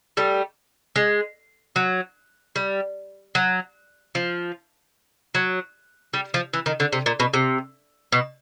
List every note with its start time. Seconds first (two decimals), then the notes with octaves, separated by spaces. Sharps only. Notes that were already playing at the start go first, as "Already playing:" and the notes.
0.17 G3 A3
0.96 G#3
1.76 F#3
2.56 G3
3.35 F#3
4.15 F3
5.35 F#3
6.14 G3
6.34 F3
6.53 E3
6.66 D#3
6.80 D3
6.93 C3
7.06 A#2
7.20 B2
7.34 C3
8.12 B2